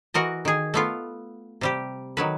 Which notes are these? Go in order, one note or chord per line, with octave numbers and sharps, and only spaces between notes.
E3 F#4 A#4 D#5
D#3 G#4
A3 B3 F4
C3 G3 G4
D#3 F#3 B4